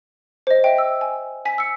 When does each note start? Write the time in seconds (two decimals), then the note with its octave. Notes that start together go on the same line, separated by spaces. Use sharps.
0.47 C5 D#5
0.64 E5 G5
0.78 E6
1.01 G#5
1.45 G#5 B6
1.58 E6 C#7